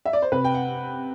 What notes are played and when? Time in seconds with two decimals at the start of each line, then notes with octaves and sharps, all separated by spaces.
0.05 E5
0.13 D5
0.22 C5
0.32 C3 B4
0.44 G5
0.55 F#5